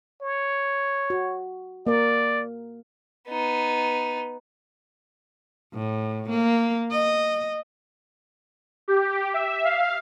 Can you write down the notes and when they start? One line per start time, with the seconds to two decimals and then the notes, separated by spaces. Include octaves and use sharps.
0.22 C#5
1.10 F#4
1.87 A#3 A#4 D5
3.30 B3 D#4
5.74 A2
6.30 A#3
6.91 D#5
8.88 G4
9.34 E5
9.65 F5